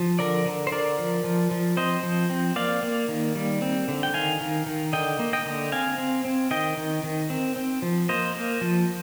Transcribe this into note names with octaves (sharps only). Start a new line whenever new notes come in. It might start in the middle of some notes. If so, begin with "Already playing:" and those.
Already playing: F3
D3 A#4 D5
D3
C5
D3 A#4 D5
F3
F3
F3
C4 C5 D#5
F3
C4
A#3 D5 F5
A#3
D#3
G3
C4
D3
G5
D#3 F5 G#5
D#3
D#3
D3 D#5 G5
A#3
D#5 G5
D3
C4 F5 G#5
C4
C4
D#3 D#5 G5
D#3
D#3
C4
C4
F3
A#3 C5 D#5
A#3
F3